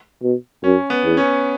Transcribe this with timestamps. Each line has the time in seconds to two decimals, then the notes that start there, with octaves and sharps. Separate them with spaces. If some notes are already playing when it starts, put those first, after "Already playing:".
0.22 B2
0.63 F#2 C#4
0.90 B3
1.04 E2
1.17 C#4